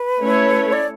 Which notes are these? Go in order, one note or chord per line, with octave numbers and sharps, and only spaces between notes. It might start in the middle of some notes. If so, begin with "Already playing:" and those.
Already playing: B4
A3 C#4 E4 A4 C#5
D5